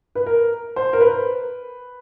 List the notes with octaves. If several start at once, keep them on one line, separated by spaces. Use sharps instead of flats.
B4
A#4
C5
A#4
B4